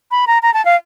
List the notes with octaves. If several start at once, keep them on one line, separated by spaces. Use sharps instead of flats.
B5
A#5
A#5
A5
F5